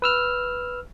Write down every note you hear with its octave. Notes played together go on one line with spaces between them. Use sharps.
B4 E6 F6